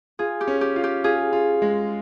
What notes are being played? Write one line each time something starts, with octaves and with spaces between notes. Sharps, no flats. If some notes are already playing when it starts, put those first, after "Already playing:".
F4 G#4
G4
C#4
G4
F4
G4
F4 G#4
F4
G#3